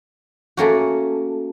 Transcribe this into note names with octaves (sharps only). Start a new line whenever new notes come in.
A3 A#3 C#4 F#4